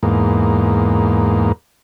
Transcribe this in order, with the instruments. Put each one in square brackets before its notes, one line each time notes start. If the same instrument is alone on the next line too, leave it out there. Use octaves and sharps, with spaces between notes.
[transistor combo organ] E2 G#2 A#3